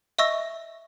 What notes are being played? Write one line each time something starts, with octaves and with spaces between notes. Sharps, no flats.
D#5 E5 C#6 E6 A#6